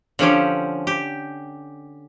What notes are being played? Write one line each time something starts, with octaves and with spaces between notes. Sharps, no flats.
D3 F3 C#4 G4
G4